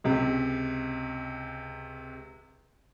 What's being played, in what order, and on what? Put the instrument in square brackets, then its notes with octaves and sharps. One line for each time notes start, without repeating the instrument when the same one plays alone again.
[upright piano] C#2 C3